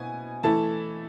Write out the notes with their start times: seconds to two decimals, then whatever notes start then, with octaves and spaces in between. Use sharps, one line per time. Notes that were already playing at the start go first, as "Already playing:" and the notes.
Already playing: B2 B3 E4 G#5
0.43 E3 A3 E4 A5